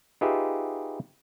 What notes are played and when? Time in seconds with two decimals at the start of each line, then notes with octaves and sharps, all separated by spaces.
0.21 D#4 F4 G4 G#4 B4 E5